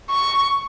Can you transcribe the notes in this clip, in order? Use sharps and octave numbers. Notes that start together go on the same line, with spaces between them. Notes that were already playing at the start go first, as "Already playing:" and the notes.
C#6